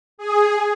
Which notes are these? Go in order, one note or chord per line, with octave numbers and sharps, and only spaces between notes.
G#4